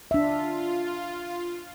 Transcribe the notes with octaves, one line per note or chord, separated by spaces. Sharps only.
D4 F4 E5